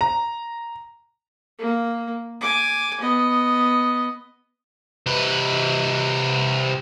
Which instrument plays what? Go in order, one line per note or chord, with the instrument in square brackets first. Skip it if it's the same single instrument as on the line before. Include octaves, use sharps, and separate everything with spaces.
[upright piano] A#5
[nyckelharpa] A#3
G#5 D6
B3 D#5
[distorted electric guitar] C3 B4